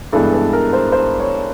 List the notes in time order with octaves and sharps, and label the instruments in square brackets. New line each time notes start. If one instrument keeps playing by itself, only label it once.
[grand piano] G2 E3 G#3 B3 A4
A4
A#4
C5
C5
C#5